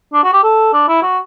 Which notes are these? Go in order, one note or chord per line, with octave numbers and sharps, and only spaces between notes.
D4
F#4
G4
A4
D4
E4
F#4